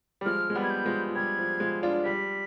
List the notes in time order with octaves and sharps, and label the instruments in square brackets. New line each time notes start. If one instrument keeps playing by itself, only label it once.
[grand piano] G3
[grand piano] F3 G#3 [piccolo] F6
[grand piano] G#3
G3 B3
[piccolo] G#6
G6
[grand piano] F3 G#3
F3
[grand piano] G3 [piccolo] G#6
[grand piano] F3
F3 G#3
D4 F4
[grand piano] G3 [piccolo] B6